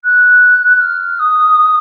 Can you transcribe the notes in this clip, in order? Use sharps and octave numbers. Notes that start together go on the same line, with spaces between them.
F#6
F6
D#6